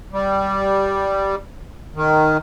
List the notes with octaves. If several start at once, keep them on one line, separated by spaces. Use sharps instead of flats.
G3
D#3